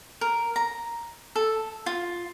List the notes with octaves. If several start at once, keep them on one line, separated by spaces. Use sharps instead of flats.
A#4
A#5
A4
F4